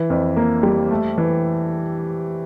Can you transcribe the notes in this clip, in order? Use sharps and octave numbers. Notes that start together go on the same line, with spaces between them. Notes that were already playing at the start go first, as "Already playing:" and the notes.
Already playing: E3
F2
A#3
G3
A3
E3